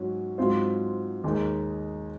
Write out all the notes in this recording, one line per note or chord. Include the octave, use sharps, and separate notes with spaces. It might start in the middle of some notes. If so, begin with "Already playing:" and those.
Already playing: G#2 F#3 C#4
G#2 F#3 C4 F4 C5
D#2 D#3 G#3 D#4 G#4